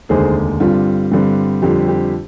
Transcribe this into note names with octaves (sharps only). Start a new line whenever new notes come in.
F1 D#2 D3 G#3 G#4 C5
G2 D3 G3 C4 F4
G2 D3 G3 C4
F2 D3 G3 C4 G4
G4